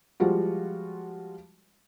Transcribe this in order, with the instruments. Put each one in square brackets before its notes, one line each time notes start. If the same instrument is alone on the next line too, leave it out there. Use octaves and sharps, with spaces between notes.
[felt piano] F3 G3 G#3 F4 F#4